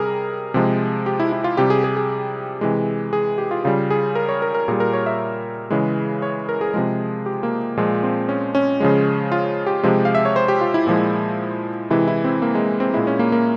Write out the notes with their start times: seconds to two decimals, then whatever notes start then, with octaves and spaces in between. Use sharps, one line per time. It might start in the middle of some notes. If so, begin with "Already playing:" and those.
Already playing: C3 G3 G#4 A#4
0.54 C3 F3 G#3
1.06 G4
1.20 E4
1.32 E4
1.44 F4
1.57 C3 G3 G4
1.70 G#4
1.84 G#4
1.97 G#4
2.61 C3 E3 G#3
3.13 G#4
3.38 G4
3.51 F4
3.64 C#3 G3 F4
3.90 G#4
4.15 A#4
4.29 C#5
4.42 A#4
4.54 A#4
4.68 A#2 G3 G#4
4.80 A#4
4.93 C#5
5.06 E5
5.70 C#3 E3 G#3
6.22 C#5
6.49 A#4
6.61 G#4
6.74 C3 F3 G#3
7.26 G4
7.43 A#3
7.77 A#2 F3 G#3
8.03 C4
8.29 C#4
8.55 C#4
8.80 C#3 F3 G#3
9.32 F4
9.67 G4
9.83 C3 F3 G#3
10.05 F5
10.15 E5
10.25 C#5
10.36 C5
10.48 G4
10.61 F4
10.74 E4
10.87 A#2 F3 G#3
11.90 C3 E3 G#3 E4
12.08 E4
12.24 C4
12.42 A#3
12.55 G#3
12.80 C4
12.94 A#2 G#3 E4
13.07 C#4
13.19 A#3
13.32 A#3